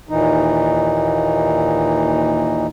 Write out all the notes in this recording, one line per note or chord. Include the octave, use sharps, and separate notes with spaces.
D#2 A#2 E3 D#4